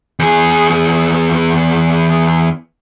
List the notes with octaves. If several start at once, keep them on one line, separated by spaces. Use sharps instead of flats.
E2 G#4